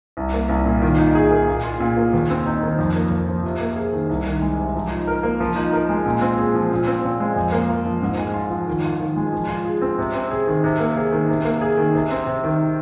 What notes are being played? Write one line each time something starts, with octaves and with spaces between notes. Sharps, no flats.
C2
A#3
C2
A#2
D#3
D#4
G#4
A#3
A#2
F4
A#2
A#3
D#2
C4
D#4
D#3
F2
A#3
F2
F3
C3
A#3
G#4
D#3
C2
D#3
G#3
C3
F3
D#4
A#4
A#3
F3
D#4
A#4
G#3
A#2
C4
G#4
F3
A#2
C4
A#2
G#3
F2
A#3
F4
F3
G#2
G#3
F4
F3
D#3
F4
D#3
G#3
F3
F4
G#4
C4
C3
C4
G#4
D#3
C3
A#3
G#4
D#3
C3
A#3
G#4
D#3
C3
C4
C3
D#3